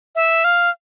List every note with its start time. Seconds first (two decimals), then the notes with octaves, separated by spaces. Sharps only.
0.15 E5
0.44 F5